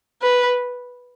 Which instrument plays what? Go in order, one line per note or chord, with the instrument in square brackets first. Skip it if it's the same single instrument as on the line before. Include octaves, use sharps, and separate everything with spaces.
[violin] B4